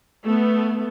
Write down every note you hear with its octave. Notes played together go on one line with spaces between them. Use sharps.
A3 B3